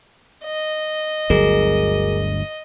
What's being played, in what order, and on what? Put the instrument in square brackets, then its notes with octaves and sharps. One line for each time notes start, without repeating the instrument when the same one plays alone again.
[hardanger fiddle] D#5
[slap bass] G1 D2 F#3 [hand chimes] G#4 A#4